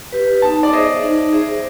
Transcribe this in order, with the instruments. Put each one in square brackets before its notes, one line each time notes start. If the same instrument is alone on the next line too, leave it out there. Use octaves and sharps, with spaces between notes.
[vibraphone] G4 B4
[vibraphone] D#4 [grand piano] A5
[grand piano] D5
[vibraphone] G#4 C5 E5 [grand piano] D#5
[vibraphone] D#4
G#4 C5 E5